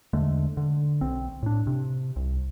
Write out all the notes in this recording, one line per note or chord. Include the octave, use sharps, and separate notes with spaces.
E2 D3 G#3 A3
D3
B1 C4
A2 D4
C3
C2